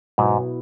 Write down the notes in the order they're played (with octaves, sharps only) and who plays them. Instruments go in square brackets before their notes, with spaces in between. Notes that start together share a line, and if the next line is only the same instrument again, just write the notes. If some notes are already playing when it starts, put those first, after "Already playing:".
[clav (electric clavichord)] G#2 [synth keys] B2 F#3 B3 E4